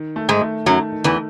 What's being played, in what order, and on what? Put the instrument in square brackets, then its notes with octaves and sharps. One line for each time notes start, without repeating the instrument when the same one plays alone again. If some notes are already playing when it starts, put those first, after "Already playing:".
Already playing: [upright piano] D#3
A3
[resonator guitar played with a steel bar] G#2 G#3
[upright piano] A3
[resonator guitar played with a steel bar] F#2 F#3 [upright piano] D#3
[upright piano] D#3
[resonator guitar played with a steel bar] E2 E3